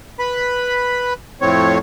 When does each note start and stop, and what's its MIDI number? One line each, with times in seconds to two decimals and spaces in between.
0.19 1.13 71
0.19 1.13 83
1.41 1.78 41
1.41 1.78 45
1.41 1.78 60
1.41 1.78 73